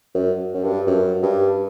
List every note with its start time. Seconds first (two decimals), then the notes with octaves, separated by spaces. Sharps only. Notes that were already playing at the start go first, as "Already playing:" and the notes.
0.15 F#2
0.54 F#2
0.64 G2
0.87 F#2
1.23 G2